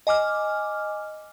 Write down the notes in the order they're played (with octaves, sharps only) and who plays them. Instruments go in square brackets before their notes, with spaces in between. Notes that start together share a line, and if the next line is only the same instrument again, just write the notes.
[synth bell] D#5 G#5 D6 F6